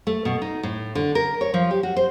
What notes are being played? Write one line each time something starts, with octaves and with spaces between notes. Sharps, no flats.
A3
B2
D#4
A2
D3
A#4
C#5
F3
G4
F#4
C5